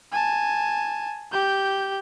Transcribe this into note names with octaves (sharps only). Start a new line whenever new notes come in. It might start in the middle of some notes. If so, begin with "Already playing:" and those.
G#5 A5
G4 G6